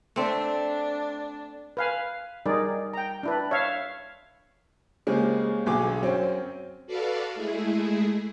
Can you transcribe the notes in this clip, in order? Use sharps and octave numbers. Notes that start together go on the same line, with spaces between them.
A3 C4 D4
B4 F5 G#5
G3 D#4 G#4 A#4 D5
G5 A#5
D4 E4 B4
C#5 E5 F5
C#3 G#3 A#3 C4 G4
B1 D3 G#4 D6
F#2 C4 C#4
F#4 A4 B4 D5 F5
G#3 A3 E4 G#4